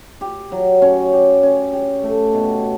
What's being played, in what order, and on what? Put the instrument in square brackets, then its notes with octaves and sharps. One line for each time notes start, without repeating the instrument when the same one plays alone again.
[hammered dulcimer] G4
F#3
C#4
G4
C#4
G4
A3
B2